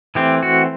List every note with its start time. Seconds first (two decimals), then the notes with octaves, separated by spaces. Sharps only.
0.15 E3 A3 C4 G4
0.43 F#4